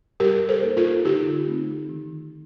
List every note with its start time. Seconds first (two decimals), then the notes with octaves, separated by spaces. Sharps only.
0.20 G3 G4 A#4
0.49 A4 C5
0.62 A#3 D#4
0.77 F4 A4
1.05 D3 D#4 G4
1.47 A3 C4 D#4
1.89 D#3